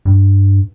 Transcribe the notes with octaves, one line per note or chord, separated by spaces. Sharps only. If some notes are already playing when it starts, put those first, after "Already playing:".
G2